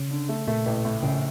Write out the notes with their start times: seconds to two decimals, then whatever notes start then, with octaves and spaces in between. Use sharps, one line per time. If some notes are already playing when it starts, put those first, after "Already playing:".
Already playing: C#3
0.11 D3
0.29 A3
0.48 A#2 A3
0.66 A1
0.85 A2
1.03 A#1 C#3